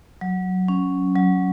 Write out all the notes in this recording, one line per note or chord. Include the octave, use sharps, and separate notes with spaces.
F#3
C#4
F#3